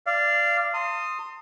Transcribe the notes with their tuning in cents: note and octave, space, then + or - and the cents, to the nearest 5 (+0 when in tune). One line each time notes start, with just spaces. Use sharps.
D5 +0 F5 -20
A5 +45 C6 +0 D#6 +0